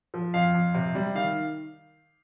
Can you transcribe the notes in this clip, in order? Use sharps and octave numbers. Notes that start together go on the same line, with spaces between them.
F3
F2 F5
F2
C3
G3
D#3 F5